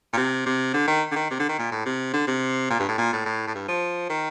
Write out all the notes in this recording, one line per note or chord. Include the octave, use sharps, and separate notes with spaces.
A#2
C3
C3
D3
D#3
D3
D#3
C3
D3
D#3
A#2
A2
C3
D3
C3
A#2
G2
A2
A#2
A2
A2
A2
G2
F3
D#3